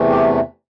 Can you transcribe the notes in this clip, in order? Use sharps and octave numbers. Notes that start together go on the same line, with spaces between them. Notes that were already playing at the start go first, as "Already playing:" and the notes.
Already playing: E2 C3 E3 A3
G4